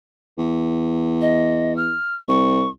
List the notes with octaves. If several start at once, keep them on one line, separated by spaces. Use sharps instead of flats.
E2
D#5
F6
C2 C#6